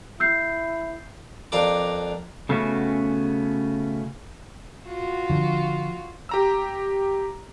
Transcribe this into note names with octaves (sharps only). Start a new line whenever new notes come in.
E4 E6 G6 C7
F2 D4 A#4 F5 A#5 D6
C#3 A3 B3 C#4 F#4
F4 F#4
D3 F3
G4 A#5 E6